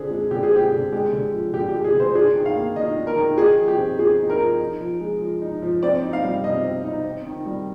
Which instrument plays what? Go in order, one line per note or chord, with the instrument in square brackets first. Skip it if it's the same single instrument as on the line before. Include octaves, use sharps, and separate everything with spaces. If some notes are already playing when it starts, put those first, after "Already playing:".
Already playing: [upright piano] D3 C4 G#4
G#3
D3 G4
G#4
C4 G4
D3
G#3 G4
D3
F3
D3 G4
G4
G#3
G#4
D3
C5
D4 G#4
D#3
F5
A#3
D#3 D#5
D4
A#4
D#3
D#4 G#4
F3
G4
C4
F3 G#4
D#4
A#4
F3
D#4
F3
G#3
F3
D#4
F3
C4 D5
D#4
F5
G3
C3 D#5
C4
D#4
C4
D#3
G3